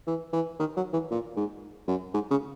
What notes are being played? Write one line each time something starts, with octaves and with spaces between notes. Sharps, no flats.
E3
E3
D#3
F#3
E3
A#2
G#2
F#2
G#2
C#3